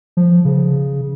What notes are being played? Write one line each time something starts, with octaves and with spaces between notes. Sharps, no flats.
F3
C#3